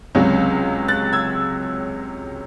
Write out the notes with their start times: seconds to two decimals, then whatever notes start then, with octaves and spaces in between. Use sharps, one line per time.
0.15 C#2 C3 F#3 C#4
0.88 F#6 A6
1.12 E6 G#6